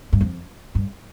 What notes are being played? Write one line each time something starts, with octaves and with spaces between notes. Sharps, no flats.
G2
F2
G2